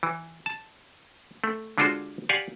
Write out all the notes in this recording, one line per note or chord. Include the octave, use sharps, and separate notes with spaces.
E3
A5
A3
D3 G#3 D4 F4 F#4 C5
G4 D5 F5 F#5 G#5